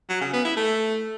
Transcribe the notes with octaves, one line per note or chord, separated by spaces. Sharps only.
F#3
C#3
B3
E4
A3